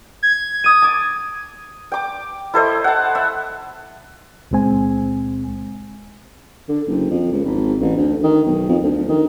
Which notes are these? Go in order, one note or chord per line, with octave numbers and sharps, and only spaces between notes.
G#6
D#6 D#7
A5 D6
G5 D6
E4 A4 C5 D#5
F#5 A5
E5 F#5 E6
C#2 A#2 G#3 C4 G#5
D3
F#1
F2
C#2
G#1
A1
D2
D#3
B1
F2
D2
D#3